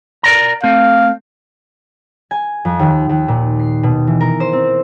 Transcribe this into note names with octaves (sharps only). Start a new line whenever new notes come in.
A#4 D5 A#5
A3 C4 F5
G#5
F2
D#2
D#2
A#2
C7
B2
E3
A#4
C5
C4